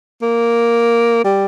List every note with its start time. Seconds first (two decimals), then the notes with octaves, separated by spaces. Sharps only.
0.22 A#3
1.24 G3